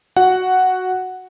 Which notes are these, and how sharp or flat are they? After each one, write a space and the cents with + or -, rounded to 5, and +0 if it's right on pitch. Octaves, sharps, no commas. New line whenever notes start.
F#4 +0 F#5 +0